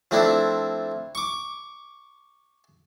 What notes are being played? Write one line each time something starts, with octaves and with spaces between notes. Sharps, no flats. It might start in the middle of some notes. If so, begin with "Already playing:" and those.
F3 A3 C4 D4 E4
C#6 D6